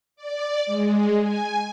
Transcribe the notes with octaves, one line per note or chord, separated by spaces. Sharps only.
D5
G#3
G#5